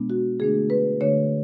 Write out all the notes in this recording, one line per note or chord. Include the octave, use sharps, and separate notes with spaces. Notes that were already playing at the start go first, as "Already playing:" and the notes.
Already playing: B2 G#3 B3 D4
F#4
D3 A3 D4 G#4
B4
D3 A3 D4 C#5